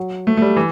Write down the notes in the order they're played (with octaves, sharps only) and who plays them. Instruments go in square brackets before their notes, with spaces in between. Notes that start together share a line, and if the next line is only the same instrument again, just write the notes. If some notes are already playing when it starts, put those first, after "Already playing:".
Already playing: [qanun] F#3
[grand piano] A3
A3
G3
E3